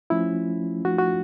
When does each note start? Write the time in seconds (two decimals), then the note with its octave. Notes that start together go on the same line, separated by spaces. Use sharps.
0.10 F3 A3 C#4 E4 F4
0.85 F3 A3 D4 F4 F#4
0.98 F#4